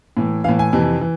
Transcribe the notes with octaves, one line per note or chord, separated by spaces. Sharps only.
A2 E3
A2 E3 F5
G#5
F2 C3 E3
E3